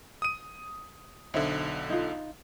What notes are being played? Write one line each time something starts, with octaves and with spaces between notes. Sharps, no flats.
D#6 D#7
B1 D3 D#4 C5 E5
D#4 F4